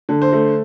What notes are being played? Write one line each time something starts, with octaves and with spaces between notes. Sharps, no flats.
D3
C5
A3